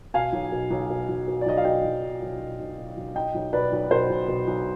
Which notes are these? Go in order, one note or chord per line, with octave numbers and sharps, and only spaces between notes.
B2 F5 G#5
B1
B2
B1
B2
B1
B2
D5
B1 D#5
F5
B2 D#5 G5
B1
B2
B1
B2
B1
B2
B1
B2 D#5 G5
B1
B2 B4 D5
B1
B2 C5
B1
B2
B1